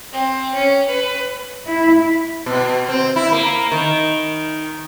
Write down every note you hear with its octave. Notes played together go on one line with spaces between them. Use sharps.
C4
C#4
B4
E4
B2
C4
E4
A#3
D#3